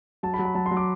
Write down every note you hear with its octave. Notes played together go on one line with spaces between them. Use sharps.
F#3 A5
B5
F#3
B5
F#3 A5
C6
F#3
D6